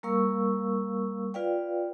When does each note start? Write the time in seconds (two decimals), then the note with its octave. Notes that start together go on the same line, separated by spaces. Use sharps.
0.03 G3 A#3 A#4 F5 C#6 E6
1.34 F4 B4 D5 F5 G5